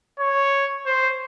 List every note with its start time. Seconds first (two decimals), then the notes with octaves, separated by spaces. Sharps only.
0.19 C#5
0.86 C5